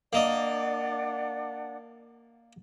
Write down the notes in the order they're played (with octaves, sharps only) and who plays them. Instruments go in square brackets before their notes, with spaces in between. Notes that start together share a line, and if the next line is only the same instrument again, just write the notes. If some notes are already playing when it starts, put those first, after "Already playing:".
[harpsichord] A#3 D#5 [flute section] D4 D5 F#5